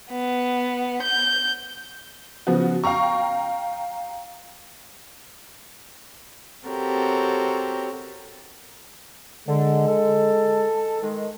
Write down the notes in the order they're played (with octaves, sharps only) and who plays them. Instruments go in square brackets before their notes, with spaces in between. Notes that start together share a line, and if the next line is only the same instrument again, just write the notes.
[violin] B3
G6
[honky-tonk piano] C#3 F3 B3 F#4
F5 G5 A#5 C#6
[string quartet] C4 F#4 G4 A4 A#4 C#5
[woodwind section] D3 [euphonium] G#3
[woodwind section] A4
D#3 G#3